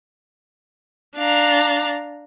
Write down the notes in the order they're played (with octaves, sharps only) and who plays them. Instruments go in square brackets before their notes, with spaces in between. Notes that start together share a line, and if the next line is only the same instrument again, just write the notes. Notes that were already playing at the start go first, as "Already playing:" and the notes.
[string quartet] D4 F5 A#5